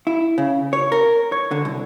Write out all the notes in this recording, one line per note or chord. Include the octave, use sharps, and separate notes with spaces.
E4
C#3
C#5
A#4
C#5
D3
C2